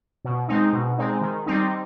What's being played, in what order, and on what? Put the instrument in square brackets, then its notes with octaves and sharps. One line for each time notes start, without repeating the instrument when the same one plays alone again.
[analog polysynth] B2
G#3 C4 D#4
B2
G#3 C4 D#4
D#3
G3 C4 D#4